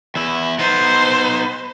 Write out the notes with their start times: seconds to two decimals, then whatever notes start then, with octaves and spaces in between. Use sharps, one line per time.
0.15 E2 E4
0.59 B3 D#4 C5